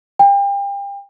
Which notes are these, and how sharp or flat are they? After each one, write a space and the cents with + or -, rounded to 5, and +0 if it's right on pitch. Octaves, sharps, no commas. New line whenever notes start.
G5 +35